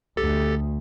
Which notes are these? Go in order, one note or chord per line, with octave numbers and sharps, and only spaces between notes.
D2 G4 A4 A6